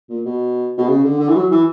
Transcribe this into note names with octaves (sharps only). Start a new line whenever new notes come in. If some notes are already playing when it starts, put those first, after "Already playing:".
A#2
B2
B2
C#3
D3
D3
E3
F#3
E3